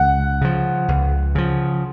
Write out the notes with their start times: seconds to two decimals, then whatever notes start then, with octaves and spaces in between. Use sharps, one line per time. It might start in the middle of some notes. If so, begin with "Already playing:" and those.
Already playing: C#2 F#5
0.41 C#3 F3
0.88 C#2
1.35 C#3 F3